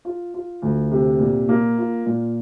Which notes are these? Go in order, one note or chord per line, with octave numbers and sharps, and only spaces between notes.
F4
F4
D2
C3
A#2
A#3
F4
A#2